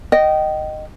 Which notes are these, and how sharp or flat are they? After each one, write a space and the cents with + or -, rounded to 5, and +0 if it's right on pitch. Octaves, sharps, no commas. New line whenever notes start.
D#5 -10 G5 -25